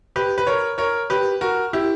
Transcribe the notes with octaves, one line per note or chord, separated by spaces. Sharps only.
G4 B4
B4
A#4 C#5
A#4 C#5
G4 B4
F#4 A#4
E4 G4